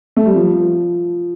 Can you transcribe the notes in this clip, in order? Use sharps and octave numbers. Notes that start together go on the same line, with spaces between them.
A3
G3
F3